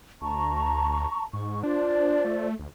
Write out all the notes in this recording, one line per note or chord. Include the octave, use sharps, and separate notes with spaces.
D2 A5 A#5 C#6
G#2 C#6
D4 F4 C5 D5
A3
D2